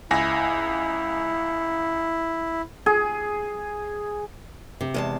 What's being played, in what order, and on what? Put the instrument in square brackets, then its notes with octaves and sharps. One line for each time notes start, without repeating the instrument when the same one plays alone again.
[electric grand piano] C#2 G#5 A#6 [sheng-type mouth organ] E4
[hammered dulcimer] G#4
[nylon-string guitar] C3
[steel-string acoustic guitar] E2 G#3 A5